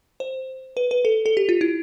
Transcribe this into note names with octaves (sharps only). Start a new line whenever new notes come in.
C5
B4
B4
A4
A4
G4
F4
E4